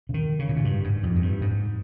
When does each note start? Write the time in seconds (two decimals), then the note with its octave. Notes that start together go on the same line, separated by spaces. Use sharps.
0.09 C#3
0.14 D#3
0.39 C#3
0.49 A#2
0.56 G#2
0.65 G2
0.84 G#2
1.03 F2
1.16 G#2
1.22 G2
1.41 G#2